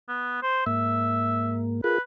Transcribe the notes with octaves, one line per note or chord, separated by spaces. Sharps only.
B3
C5
G#2 A#3 E5
F4 G#4 A#4 B4